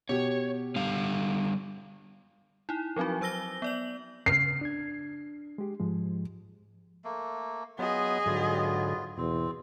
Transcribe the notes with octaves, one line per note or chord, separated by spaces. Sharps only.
B2 G4 C#5
D3 G3 F5
D#4 E4
F3 F#3 C4 D#4 F#4
F#3 C5 E6 A#6 G7
B3 D5 F#7
C#3 F6 C7
D4 G#6
G#3 G4
G#2 F3 G#3
A3 A#3
F#3 B3 F4 G#4 D#5
G#2 D3 F#3 B3 F4
E2 B2 C4